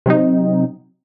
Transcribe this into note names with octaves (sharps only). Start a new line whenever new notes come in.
C3 F#3 C4 D#4